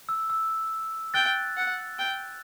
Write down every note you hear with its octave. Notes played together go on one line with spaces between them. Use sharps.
E6
E6
G5 F#6 A6
F#5
G5